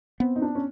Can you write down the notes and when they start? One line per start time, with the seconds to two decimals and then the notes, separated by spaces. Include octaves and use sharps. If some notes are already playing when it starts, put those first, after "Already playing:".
0.20 B3 C4
0.36 D#4
0.42 D4
0.55 C#4